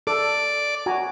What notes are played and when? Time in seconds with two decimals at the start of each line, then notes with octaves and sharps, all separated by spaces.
0.07 A4 D5
0.86 F#4 G#5 A#5